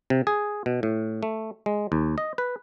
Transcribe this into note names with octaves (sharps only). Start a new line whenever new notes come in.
C3
G#4
B2
A2
A3
G#3
D#2
D#5
B4